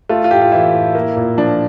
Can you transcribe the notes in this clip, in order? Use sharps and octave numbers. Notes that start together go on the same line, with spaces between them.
A3 F4
F4
A2 G4
F4
E3 E4
A2
A#3
A#2
F3 D4